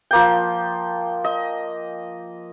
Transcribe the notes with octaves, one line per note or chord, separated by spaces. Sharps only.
F3 A#3 G5
D#5